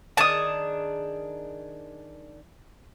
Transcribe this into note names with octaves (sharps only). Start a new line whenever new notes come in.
D#3 D4 G#4 A5 D#6